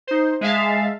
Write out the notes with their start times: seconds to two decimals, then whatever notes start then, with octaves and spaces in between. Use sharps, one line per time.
0.07 D#4 C5
0.41 G#3 E5 F5 A5